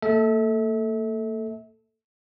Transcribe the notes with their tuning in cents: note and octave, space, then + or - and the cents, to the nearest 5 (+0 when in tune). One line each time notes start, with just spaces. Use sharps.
A#3 -40 A4 +0 E5 -35